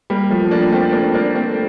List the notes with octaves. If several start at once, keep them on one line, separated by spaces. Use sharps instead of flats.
G3 A#3
F3 A3
A#3 D4
A3 C4
A#3 D4
A#3 D4
A3 C4